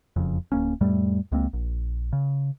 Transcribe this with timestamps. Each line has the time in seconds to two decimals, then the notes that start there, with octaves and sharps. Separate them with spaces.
0.16 E1 F2 C#3
0.52 D1 A#3 C#4
0.81 F2 A2 G3 A3
1.32 C#2 G#3 A#3 C4
1.53 A#1
2.13 C#3